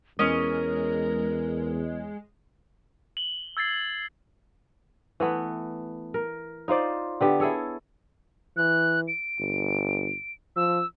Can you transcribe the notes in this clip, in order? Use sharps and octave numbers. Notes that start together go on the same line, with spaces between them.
E2 G#3 C#4 A#4 D#5
F#7 G7
E6 G#6 A6 C7
E3 A3 B3
A#4
D#4 F4 C5 D5
D3 B3 G4
E4 G#4 A4 C#5
E3 F#6
D7
G1
F3 E6